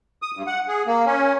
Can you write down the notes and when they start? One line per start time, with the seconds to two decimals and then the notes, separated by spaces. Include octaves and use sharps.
0.22 D#6
0.36 G2
0.47 F#5
0.68 G#4
0.87 A#3
1.06 C#4